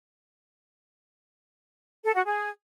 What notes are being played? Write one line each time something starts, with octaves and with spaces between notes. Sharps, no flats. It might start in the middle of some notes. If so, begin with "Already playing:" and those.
A4
F#4
G#4